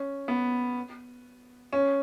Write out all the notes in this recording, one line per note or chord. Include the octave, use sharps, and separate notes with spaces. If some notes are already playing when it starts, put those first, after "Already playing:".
Already playing: C#4
B3
C#4